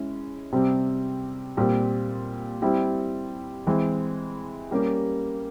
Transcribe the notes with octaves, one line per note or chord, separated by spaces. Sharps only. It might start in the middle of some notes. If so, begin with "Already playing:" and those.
Already playing: G#3 C#4 E4
C3 G3 C4
A#2 G3 C4
G3 C4 E4
E3 G#3 C4
G3 A#3 C#4 G4